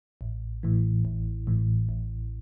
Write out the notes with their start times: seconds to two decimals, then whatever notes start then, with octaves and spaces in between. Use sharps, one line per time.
0.21 A1
0.63 A2 E3
1.05 A1
1.47 A2 E3
1.89 A1